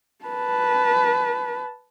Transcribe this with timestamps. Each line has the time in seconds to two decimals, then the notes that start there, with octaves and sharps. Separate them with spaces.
0.25 B4 A5